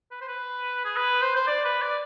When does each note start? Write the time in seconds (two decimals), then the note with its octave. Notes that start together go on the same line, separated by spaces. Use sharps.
0.11 B4
0.21 C5
0.28 B4
0.85 G#4
0.96 B4
1.22 C5
1.36 C5
1.47 D5
1.65 B4
1.82 D5